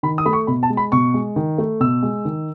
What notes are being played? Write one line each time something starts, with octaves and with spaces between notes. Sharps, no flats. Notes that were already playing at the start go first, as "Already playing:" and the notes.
D#3 B5
D#6
A3 B5
C#6
B2 B5
A5
G#3
B5
B2 C#6
G#3
D#3
A3
B2 E6
G#3
D#3